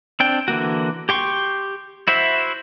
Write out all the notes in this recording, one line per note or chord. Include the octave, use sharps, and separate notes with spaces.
C4 D4 G5
D3 E3 A#3 F#4
G4 G5 C6 C#6
E4 F#4 C5 E5